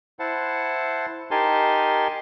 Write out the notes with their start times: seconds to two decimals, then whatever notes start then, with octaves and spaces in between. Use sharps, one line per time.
0.19 E4 C5 F#5 A5
1.31 D#4 G4 A#4 G#5 A5 C6